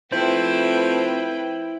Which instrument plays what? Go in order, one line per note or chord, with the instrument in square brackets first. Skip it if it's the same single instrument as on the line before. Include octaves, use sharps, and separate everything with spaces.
[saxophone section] F3 A3 C4 [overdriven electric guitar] E4 [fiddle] B4 G5 [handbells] C5